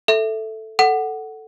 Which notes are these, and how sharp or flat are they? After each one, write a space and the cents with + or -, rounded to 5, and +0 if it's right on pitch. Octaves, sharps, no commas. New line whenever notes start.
A4 +0 E5 +0
A4 +0 F#5 +10